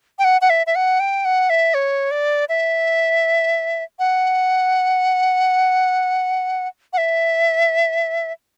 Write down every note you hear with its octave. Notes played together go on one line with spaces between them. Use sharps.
G5
F#5
F#5
E5
E5
F#5
G5
F#5
E5
C#5
D5
E5
F#5
F#5
E5